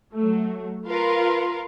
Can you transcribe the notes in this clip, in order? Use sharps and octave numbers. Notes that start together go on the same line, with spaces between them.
F#3 A3
F4 A#4 B4 F5